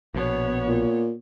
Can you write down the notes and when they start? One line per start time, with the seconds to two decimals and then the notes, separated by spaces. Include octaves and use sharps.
0.14 A#1 B2 B3 C#5
0.68 A#2